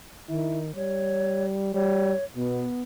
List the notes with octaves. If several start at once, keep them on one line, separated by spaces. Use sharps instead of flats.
D#3 E4
G3 C#5
G3 C#5
B2 B3